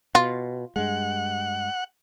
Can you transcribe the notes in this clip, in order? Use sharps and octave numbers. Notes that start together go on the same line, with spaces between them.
B2 F4
G2 G#3 F#5